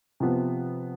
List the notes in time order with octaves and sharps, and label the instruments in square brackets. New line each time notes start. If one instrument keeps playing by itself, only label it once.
[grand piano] C3 F3 B3